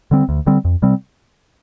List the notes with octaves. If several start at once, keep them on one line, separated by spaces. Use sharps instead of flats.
D3 G3 C4
D2
D3 G3 C4
F2
C3 G3 C4